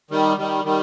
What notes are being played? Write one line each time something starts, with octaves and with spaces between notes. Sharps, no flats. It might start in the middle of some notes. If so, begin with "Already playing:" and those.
D#3 G3
D#3 G3
D#3 G3